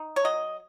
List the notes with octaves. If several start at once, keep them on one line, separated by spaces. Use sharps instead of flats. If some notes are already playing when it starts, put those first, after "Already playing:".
Already playing: D#4
C#5
F#3 D#5